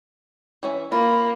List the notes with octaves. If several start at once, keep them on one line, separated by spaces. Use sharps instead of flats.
E3 C#4 E5
A#3 F4 B5